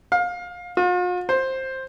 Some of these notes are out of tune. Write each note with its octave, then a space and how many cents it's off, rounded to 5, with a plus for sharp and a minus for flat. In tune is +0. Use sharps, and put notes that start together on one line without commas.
F5 +25
F4 +45
C5 +10